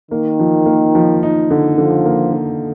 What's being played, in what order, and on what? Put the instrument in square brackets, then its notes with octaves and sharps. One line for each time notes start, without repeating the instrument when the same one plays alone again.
[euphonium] D#3 [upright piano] A#3
[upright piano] F3
A#3
F3
D#4
D3
[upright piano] D3 [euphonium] F3
[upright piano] A#3
D3